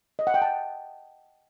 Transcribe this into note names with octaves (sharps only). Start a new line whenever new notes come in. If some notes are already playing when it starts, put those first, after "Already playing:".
D#5
F#5
G5
A5